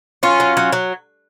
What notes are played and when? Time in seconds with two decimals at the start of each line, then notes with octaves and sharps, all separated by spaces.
0.23 F#3 C#4 F4
0.40 F#3
0.57 F#3
0.72 F#3